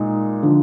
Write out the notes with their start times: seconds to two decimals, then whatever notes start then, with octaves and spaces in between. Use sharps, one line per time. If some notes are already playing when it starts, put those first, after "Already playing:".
Already playing: A#2 G#3 D#4
0.43 D3 F3